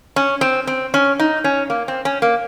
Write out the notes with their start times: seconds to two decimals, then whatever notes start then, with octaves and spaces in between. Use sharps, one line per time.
0.16 C#4
0.41 C4
0.67 C4
0.94 C#4
1.20 D#4
1.44 C#4
1.70 A#3
1.88 C4
2.05 C#4
2.22 A#3